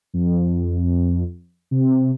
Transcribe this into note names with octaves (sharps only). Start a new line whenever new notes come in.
F2
C3